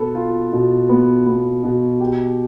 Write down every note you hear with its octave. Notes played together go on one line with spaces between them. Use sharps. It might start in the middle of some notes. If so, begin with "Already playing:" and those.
Already playing: B2 B3 A4
F4
B2
B3
B3
B2
G4